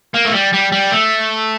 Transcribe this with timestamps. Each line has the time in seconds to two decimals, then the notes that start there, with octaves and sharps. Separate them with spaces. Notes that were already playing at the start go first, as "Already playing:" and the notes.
0.15 A#3
0.26 A3
0.34 G3
0.53 G3
0.72 G3
0.92 A3